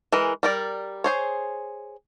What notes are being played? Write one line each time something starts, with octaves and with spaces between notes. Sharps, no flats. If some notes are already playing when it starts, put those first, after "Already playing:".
E3 G#3 A#4
G3 A#4 D5
G#4 C5 C#5